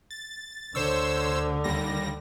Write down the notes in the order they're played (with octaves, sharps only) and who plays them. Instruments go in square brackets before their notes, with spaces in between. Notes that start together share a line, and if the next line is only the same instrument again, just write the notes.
[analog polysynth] A6
[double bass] D2 D3 [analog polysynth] C5 C#5 E6
[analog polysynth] D#2 G3 A#6